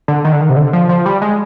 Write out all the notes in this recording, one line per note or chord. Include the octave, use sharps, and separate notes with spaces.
D3
D#3
D3
D#3
C3
D3
F3
F3
G3
G#3